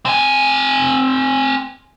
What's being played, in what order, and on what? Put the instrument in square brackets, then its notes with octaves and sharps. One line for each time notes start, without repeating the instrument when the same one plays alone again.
[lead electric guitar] C4 G#5